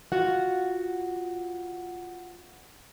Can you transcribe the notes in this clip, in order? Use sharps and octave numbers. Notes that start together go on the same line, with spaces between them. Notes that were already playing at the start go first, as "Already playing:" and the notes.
F4 F#4 F#5